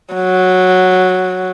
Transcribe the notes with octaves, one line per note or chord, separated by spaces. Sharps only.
F#3